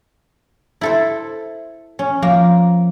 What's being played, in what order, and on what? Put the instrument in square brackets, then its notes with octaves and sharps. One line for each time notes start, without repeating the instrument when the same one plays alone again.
[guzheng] E4 A4 C5
C#4
[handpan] F3 [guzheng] A#3